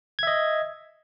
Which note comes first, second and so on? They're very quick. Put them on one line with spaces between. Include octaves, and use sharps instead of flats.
G#6 E5 D#5